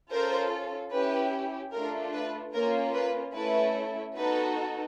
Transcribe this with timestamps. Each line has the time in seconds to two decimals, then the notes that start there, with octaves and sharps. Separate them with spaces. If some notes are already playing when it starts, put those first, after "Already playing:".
0.10 C#4 F4 A4 A#4 C5
0.91 C#4 E4 G4 B4
1.73 A3 D4 F4 A4 A#4
2.13 B4
2.53 A#3 C#4 F4 A#4
2.93 B4
3.34 A3 C#4 E4 A4 B4
4.15 B3 D#4 F#4 A4 B4